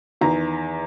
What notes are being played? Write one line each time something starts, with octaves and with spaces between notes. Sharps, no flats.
E2 D#3 A#5